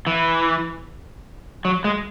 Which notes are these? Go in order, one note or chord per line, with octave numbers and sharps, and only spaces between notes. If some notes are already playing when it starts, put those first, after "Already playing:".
E3
F#3
G#3